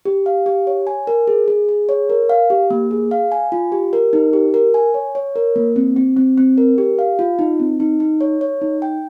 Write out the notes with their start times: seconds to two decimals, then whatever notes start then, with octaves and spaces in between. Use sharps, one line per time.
0.05 G4
0.26 F5
0.46 G4
0.67 C#5
0.87 G#5
1.07 A#4
1.27 G#4
1.48 G#4
1.69 G#4
1.89 C#5
2.09 A#4
2.29 F5
2.50 G4
2.70 A#3
2.91 G#4
3.11 F5
3.32 G#5
3.52 F4
3.72 G4
3.93 A#4
4.13 D#4
4.33 G4
4.54 A#4
4.74 G#5
4.94 C#5
5.15 C#5
5.36 A#4
5.56 A#3
5.76 C4
5.96 C4
6.17 C4
6.38 C4
6.58 A#4
6.78 G4
6.99 F5
7.19 F4
7.39 D#4
7.59 C4
7.80 D#4
8.00 D#4
8.21 C#5
8.41 C#5
8.61 D#4
8.82 G5